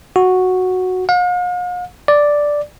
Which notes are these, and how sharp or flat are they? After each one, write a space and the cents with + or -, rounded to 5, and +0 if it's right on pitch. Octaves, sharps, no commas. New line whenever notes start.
F#4 -5
F5 +45
D5 +0